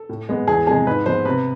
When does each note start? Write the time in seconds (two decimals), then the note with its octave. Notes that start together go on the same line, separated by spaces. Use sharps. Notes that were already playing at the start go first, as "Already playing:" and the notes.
Already playing: A4
0.09 A2
0.29 G#3 B3
0.48 E2 G#4
0.67 C3 F3 G#3 G#4
0.87 G#2 B4
1.06 F3 G#3 B3 C5
1.25 C3 B4